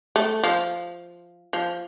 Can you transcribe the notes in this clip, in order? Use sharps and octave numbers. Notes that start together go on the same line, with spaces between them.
A3
F3
F3